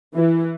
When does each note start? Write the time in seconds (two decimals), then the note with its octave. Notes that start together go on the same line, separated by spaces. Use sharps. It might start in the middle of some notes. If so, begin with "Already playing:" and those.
0.15 E3